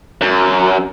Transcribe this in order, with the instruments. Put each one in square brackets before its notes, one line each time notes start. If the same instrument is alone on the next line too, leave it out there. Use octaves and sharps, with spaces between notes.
[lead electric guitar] F#2